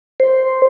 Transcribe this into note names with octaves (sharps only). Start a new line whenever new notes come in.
C5